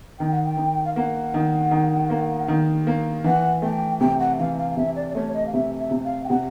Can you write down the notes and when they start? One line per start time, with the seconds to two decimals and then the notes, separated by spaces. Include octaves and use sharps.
0.19 D#3 G5
0.31 F#5
0.45 G5
0.57 D#3
0.85 F5
0.95 A#3 F#5
1.34 D#3
1.71 D#3
2.10 A#3
2.48 D#3
2.87 A#3
3.24 E3 F#5
3.62 A3 G5
4.01 C3 G5
4.19 F#5
4.39 E3 F5
4.58 F5
4.71 F5
4.77 C3 E5
4.96 D5
5.10 D5
5.15 A3 C#5
5.34 D#5
5.47 F5
5.53 C3 E5
5.78 E5
5.91 C3
6.04 F5
6.24 G5
6.29 C3 F#5